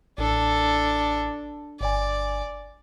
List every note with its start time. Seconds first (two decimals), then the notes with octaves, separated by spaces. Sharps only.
0.18 A1 D4 A4
1.81 G1 D5 G#5